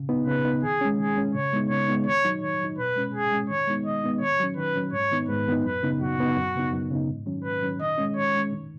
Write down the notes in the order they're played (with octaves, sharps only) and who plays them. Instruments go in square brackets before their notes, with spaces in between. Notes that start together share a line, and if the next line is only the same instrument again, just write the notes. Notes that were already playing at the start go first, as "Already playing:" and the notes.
Already playing: [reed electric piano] C#3
B3 D#4
[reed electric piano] C#3 [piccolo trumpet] B4
[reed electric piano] B3 D#4
[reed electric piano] D#3 [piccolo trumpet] G#4
[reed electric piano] G#3 C#4
[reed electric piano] D#3 [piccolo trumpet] G#4
[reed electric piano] G#3 C#4
[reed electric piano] C#3 [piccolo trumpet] C#5
[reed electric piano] G#3 B3 D#4
[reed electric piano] C#3 [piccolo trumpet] C#5
[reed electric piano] G#3 B3 D#4
[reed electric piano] D#3 [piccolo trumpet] C#5
[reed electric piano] F#3 D#4
[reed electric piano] D#3 [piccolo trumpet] C#5
[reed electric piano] F#3 D#4
[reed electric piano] B2 [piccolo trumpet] B4
[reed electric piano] G#3 C#4
[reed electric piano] B2 [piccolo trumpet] G#4
[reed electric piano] G#3 C#4
[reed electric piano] D#3 [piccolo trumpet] C#5
[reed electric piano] G#3 B3 D#4
[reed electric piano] D#3 [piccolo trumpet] D#5
[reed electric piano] G#3 B3 D#4
[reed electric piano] D#3 [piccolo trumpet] C#5
[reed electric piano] F#3 C#4
[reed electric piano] D#3 [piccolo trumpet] B4
[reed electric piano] F#3 C#4
[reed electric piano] G#2 [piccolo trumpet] C#5
[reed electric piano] D#3 B3 D#4
[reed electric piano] G#2 [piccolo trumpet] B4
[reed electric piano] D#3 B3 D#4
[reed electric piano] F#2 [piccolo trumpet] B4
[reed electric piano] C#3 B3 D#4
[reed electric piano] F#2 [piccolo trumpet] F#4
[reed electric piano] C#3 B3 D#4
F#2
C#3 B3 D#4
F#2
C#3 B3 D#4
G#2
D#3 F#3 C#4
[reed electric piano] G#2 [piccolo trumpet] B4
[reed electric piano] D#3 F#3 C#4
[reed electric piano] D#3 [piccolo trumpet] D#5
[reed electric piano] G#3 C#4
[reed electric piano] D#3 [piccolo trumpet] C#5
[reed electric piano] G#3 C#4
D#3